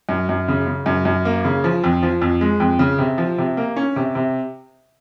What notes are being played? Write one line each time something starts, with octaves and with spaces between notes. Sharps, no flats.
F#2
F#2
C#3
C#3
F#2
F#2
A#3
C#3
F3
F2
F3
F2
G#3
F2
C#3
C3
F3
C3
A#3
C#4
C3
C3